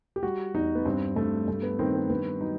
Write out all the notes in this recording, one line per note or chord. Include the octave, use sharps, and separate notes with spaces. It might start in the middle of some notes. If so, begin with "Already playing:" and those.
G4
G3 F#4
E2 D#4
B3
G2 C4
G2 A3
G2 A3
B3
D#3 C4
B3
G2 B3
F#3 D#4